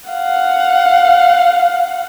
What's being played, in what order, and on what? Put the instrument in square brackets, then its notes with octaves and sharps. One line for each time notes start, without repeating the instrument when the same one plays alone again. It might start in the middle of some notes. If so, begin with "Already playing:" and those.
[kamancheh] F5 F#5